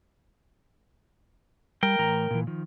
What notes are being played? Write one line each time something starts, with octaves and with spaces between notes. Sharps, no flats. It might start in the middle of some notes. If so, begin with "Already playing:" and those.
G3 A#4 G5
A2 E3 A#5
A#2 E3
D#3 F3